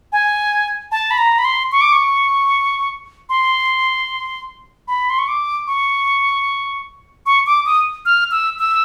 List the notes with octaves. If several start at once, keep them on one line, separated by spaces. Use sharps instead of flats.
G#5
A5
B5
A#5
B5
C6
C#6
D6
C#6
C6
B5
C6
C#6
D6
C#6
C#6
D6
D#6
F6
E6
E6